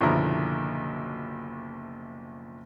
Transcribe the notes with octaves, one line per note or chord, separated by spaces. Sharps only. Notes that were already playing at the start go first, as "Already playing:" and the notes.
F#1 B1 D3 F3 E4 A#5